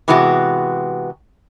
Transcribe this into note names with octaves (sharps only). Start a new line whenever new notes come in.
C3 E3 G#3 B3 F#4